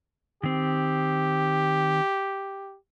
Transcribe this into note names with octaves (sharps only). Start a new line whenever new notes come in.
D#3 C4 G4